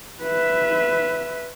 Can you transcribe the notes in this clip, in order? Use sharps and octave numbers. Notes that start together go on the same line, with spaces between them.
B4 E5